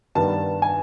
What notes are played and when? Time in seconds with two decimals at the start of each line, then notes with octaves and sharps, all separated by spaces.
0.15 G2 D#3 G3 B3 A5
0.62 G#5